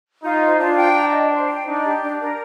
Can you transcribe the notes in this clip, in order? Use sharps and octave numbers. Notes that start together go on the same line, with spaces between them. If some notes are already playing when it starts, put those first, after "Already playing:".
D#4 F4
C5
D4 F4
G5
A#5
D#5
C5
G5
D4 D#4
G4
D4
A#4